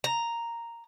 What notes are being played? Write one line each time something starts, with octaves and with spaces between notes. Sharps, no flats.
A#5